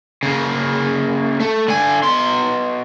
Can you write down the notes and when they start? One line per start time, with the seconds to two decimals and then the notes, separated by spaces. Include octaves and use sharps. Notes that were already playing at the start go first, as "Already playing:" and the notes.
0.23 C#3 A#3
1.40 A3
1.68 D3 G#5
2.03 B2 C6